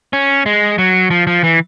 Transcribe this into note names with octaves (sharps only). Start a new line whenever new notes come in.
C#4
G#3
F#3
F3
F3
E3